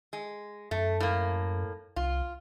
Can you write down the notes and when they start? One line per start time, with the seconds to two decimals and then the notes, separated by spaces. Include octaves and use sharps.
0.13 G#3
0.71 F#2 A3
1.00 A2 A#3
1.96 C2 F4